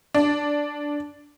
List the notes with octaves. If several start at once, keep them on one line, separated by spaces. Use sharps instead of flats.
D4